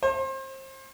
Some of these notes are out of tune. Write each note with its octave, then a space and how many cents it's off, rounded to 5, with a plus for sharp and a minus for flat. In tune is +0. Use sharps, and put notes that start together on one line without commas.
C5 +30